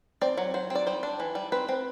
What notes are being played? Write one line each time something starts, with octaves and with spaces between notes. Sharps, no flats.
C4 D5
F#3
F#3 C5
C4
D5
G3 C5
D4
E3
G3
C4 B4
C4